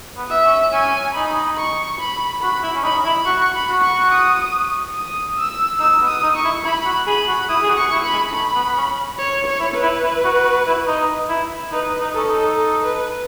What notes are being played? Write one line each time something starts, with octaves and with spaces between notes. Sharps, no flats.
B3
E5
C#4
C#4 G#5
D#4 B5
C#6
B5
F#4 B5
E4
C#4
D#4 B5
E4
F#4 C#6
B5
F#4
C#6
D#6
D#6
E6
D#4 E6
B3
D#6
D#4
C#6
E4
E4 B5
F#4
G#4 B5
F#4
E4 D#6
G#4
F#4
C#6
E4
B5
G#3
A3 B5
B3
C#4
C#5
C#5
E4
B4
E4
E4
F#4
F#4
E4
D#4
E4
D#4 B4
D#4
C#4 A4
D#4
A4
B4